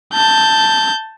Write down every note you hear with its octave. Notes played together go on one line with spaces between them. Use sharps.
A5 G6